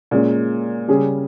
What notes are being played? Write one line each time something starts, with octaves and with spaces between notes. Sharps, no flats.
A#2 G#3 C#4
C#3 G3 C#4 G#4